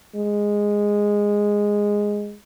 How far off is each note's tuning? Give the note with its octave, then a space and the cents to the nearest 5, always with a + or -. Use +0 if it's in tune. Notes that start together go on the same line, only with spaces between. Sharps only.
G#3 -10